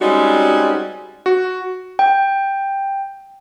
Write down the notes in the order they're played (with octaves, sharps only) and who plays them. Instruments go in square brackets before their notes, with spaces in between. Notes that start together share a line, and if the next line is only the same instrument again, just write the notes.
[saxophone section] G3 G#3 C4 C#4 D#4 F#4
[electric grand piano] F#4
[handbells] G5